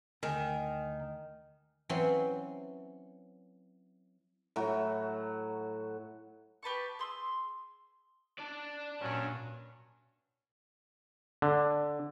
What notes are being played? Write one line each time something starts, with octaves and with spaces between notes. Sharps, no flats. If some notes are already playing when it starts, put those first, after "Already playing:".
D2 D#3 G#5
E3 F#3 C4 C#4 C6
A2 F#3 F#4
G4 B4 A5 C#6
G#4 C6 E6
D4 D5
G2 A#2 F#3 C#4
D3